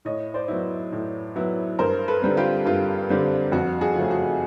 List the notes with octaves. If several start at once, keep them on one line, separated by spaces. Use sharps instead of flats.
A2 C#5 D#5
C5 D5
F#3 B3 E4
A2
F#3 B3 E4
G2 A#4 C5
A4 B4
D3 G3 C4
F4 G4
G2 F4
D3 G3 C4
F2 F#4
F#4 G#4
C#3 F3 A3 C#4
F#4